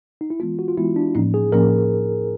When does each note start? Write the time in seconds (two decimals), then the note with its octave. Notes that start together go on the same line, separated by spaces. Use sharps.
0.21 D#4
0.30 E4
0.40 E3 G#3 B3 F4
0.59 F#4
0.68 F4
0.77 E3 G#3 B3 E4
0.96 D4
1.15 A2 F3 A#3 C#4 D#4
1.34 G#4
1.52 A2 F3 A#3 C#4 A#4